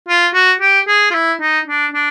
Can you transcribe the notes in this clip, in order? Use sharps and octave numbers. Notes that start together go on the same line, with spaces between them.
F4
F#4
G4
G#4
F4
E4
D#4
D4
D4